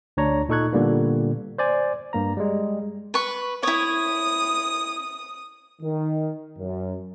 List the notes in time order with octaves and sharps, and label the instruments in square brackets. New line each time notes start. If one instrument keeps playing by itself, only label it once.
[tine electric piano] D2 D4 C#5 A#5
A#2 D#4 A4 C#6 F#6 G#6
A#2 D3 G3 A#3 B3
C5 D5 G#5
G2 A#3 A#5
G3 G#3
[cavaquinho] B4 C#6
[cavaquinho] E4 C#5 [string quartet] D#6
[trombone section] D#3
F#2